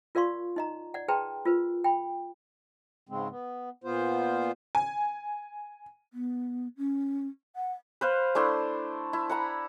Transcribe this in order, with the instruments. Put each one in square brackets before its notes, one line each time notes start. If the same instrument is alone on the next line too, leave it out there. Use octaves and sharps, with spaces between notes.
[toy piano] F4 A#4 D5 F5 C6 C#6
D#4 D#5 A#5
D5 F#5
G#4 B4 G5 A5 A#5 C6
F4 A#4 B4
G5 B5
[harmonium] G#2 C#3 G#3 C4
B3
A#2 B3 F4 C5
[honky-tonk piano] G#5
[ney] B3
C#4
F#5
[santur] B4 C5 F5
A3 D4 E4 C6
E4
F#5 A#5 B5